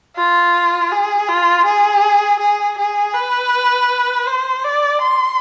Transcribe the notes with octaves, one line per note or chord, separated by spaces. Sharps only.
F4
G#4
F4
G#4
G#4
G#4
B4
C5
D5
C6